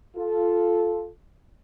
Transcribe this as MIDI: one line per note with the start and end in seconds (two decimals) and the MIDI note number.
0.16 1.07 65
0.16 1.07 69